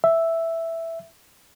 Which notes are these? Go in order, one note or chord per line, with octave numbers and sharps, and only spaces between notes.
E5